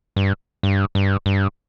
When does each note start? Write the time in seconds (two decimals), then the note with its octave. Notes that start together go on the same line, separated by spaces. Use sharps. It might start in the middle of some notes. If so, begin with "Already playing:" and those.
0.16 G2
0.63 G2
0.95 G2
1.26 G2